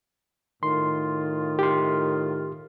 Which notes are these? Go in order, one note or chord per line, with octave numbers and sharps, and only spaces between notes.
A2 D#3 F4 C6
G4 C6